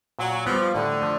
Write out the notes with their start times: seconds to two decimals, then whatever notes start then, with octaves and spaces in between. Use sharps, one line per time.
0.19 A#2 F#3
0.46 F3 G3 B3
0.74 A2 D3
1.01 F3 A3